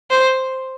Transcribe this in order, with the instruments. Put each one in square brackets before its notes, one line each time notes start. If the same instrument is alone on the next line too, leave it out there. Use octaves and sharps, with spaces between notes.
[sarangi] C5